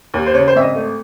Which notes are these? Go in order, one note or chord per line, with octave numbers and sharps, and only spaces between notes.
D#2
C5
C#3 C#5
C5
G#1 E5
D#5
A3